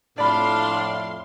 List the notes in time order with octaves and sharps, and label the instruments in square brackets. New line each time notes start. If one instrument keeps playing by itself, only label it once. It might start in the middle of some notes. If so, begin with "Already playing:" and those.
[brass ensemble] F2 A2 [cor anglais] D4 [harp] D5 B5 [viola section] F5 C6